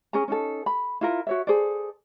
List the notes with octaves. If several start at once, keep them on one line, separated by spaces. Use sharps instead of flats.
C#4 G#4 G#5 A#5
C#4 D#4 A4
B5
E4 F4 A#4
F#4 C#5 E5
G#4 A4 C5 D5